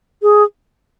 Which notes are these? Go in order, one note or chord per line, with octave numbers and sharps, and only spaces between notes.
G#4